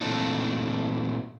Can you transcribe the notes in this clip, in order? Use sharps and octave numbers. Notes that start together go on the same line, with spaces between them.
A#2 E3 A3 C4 D4 D#4